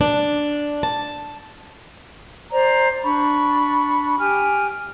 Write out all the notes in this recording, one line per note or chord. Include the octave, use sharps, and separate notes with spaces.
D4
A5
C5 D5 A#5
D4 B5 C#6
G4 G5 G#5 F6